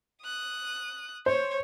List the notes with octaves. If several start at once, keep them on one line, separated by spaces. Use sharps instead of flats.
D#6 F#6
C5 C#5